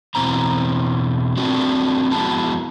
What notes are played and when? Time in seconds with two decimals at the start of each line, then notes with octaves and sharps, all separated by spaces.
0.15 E2 G2 B2 E3 C4 A#5
1.37 A3 C4 D4 F4 F#4
2.11 F2 G#3 B3 E4 F#4 A5